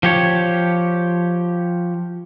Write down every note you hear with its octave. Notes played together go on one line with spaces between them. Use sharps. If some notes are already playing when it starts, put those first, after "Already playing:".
F3 G4 C#5